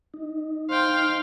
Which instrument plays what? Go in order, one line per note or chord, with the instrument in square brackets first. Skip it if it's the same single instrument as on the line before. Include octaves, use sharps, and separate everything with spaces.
[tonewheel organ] D#4
[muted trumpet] C5 [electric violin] F5 G5